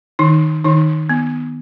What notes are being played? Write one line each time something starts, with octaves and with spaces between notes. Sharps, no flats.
D#3 D#4
D#3 D#4
B3